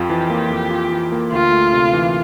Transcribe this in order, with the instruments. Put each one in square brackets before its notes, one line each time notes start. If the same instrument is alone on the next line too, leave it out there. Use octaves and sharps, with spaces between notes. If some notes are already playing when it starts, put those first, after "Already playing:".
Already playing: [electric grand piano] F2 F4 [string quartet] G4
[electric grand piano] E3
A#3
F2
F4
E3
A#3
[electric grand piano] D2 [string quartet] F4
[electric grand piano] A3
C3
E3